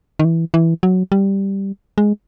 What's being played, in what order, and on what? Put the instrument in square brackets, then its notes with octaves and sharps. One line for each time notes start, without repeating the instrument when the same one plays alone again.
[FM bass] D#3
E3
E3
F#3
G3
G#3